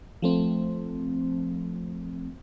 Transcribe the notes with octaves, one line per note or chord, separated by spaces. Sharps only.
F3 A3 C4